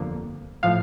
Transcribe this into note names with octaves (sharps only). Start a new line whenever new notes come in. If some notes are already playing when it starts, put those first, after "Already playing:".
Already playing: G1 F2 D3 F3 A#3
A2 F3 F5